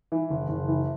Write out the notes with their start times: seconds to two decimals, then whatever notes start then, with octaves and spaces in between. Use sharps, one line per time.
0.12 E3
0.30 F#1
0.49 F#1
0.68 E3